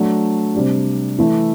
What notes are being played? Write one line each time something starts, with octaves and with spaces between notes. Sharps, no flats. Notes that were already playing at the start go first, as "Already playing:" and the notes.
Already playing: F#3 A3 D4
C3 G3 D4
E3 A3 E4